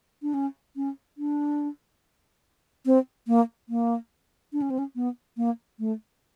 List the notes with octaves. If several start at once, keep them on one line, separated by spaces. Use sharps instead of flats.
D4
C#4
C#4
D4
C4
A#3
A#3
D4
C#4
C4
C#4
B3
A#3
A3